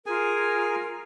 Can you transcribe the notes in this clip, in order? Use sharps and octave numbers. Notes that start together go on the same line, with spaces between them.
F4 G#4 A#4 G#5